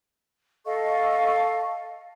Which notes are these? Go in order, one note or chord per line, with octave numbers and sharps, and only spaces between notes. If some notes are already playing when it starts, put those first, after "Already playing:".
A4 D#5 F5 C#6